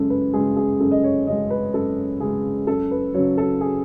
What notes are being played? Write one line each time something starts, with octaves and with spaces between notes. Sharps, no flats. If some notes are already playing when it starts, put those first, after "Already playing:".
Already playing: F#2 C#3 G#3 A4
B4
C#3 G#3 G#4
G#4
F#2 A4
D#5
C#5
C#3 G#3 D#5
B4
F#2 A4
C#3 G#3 G#4
F#2 A4
B4
C#3 F#3 C#5
A4
G#4